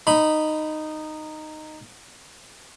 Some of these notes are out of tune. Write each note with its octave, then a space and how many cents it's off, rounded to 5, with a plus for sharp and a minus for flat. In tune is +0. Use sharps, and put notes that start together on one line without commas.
D#4 -10 B5 +0